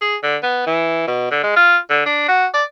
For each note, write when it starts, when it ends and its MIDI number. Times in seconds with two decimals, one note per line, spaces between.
0.02 0.16 68
0.23 0.36 50
0.43 0.63 59
0.67 1.06 52
1.07 1.31 47
1.31 1.43 50
1.43 1.52 56
1.56 1.77 65
1.90 2.03 50
2.06 2.26 62
2.28 2.46 66
2.54 2.64 74